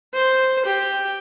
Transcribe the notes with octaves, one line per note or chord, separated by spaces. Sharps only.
C5
G4